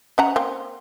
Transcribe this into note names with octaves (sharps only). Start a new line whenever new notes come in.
C#4 F#5 A#5
A#3 C4